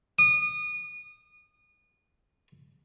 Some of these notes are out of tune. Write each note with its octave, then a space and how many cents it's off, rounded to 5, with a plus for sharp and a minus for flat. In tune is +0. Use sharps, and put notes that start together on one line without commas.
D#6 -25